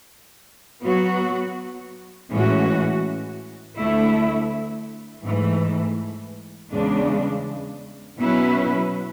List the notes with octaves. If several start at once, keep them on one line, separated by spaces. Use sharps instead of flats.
F#3 B3 F#4
A2 E3 G#3 C#4 F#4
D2 D3 A3 E4
G#2 E3 A3
E2 C#3 G#3 D4
B2 F#3 C#4 E4 B4